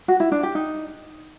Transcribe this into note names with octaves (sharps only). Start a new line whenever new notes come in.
F#4
E4
D4
G4
D#4